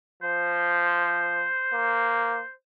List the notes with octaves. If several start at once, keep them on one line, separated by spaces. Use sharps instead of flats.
F3 C5
A#3